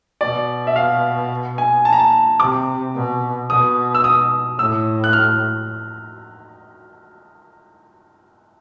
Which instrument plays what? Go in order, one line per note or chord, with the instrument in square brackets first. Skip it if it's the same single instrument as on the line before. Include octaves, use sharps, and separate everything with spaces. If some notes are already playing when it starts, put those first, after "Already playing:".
[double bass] B2 [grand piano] D5
[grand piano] E5
F5
G#5
A5
A#5
A5
[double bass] C3 [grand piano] D6
[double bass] B2
[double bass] B2 [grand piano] D#6
[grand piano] E6
D#6
[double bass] A2 [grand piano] E6
[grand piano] F#6
F6